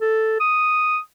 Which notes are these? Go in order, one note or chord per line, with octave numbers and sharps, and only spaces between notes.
A4
D#6